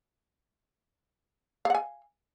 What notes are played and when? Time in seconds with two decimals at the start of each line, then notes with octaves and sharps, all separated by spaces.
1.65 F5
1.70 F#5
1.75 G#5